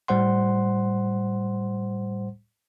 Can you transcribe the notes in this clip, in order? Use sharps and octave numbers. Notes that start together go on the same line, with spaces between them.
A2 G3 C5 F#5 C6